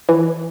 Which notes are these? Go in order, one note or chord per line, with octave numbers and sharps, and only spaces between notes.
E3